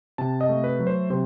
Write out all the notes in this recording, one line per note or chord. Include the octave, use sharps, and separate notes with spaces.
C3 A5
D#5
A3
B4
F#3
C5
C3 C5